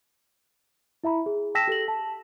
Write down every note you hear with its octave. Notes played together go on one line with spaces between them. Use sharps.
E4 E5 A#5 B5
G#4
G5 A5 E6 A#6 B6 E7
G4 A4 A#6 F#7
A5